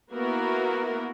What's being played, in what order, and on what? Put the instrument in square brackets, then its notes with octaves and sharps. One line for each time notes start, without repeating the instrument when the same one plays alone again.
[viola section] A#3 B3 E4 F#4 A#4